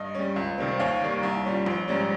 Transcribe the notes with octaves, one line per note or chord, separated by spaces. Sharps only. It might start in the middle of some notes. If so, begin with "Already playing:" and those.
Already playing: G2 D#5
G3 C#4
C#2
C3 D#3 G3 C4
D#2 C#5 F5
D#3 G3 A#3
C2
A#2 G3 C#4
A#1
G#2 G3 C#4